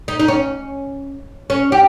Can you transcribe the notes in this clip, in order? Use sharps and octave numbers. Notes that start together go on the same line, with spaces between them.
D#4
D#4
C#4
C#4
G4